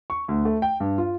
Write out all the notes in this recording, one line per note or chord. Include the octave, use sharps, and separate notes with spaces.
C#6
D2
A3
G5
G2
F4